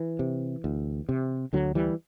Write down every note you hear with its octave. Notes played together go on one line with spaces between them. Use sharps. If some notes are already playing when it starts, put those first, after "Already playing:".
Already playing: E3
C3
D2
C3
D2 D3 F#3
E3 G3